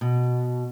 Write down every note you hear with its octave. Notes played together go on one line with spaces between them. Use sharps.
B2